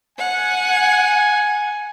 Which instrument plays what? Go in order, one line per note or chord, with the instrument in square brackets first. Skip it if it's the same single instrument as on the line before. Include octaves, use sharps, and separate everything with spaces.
[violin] F#5 [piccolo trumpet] G#5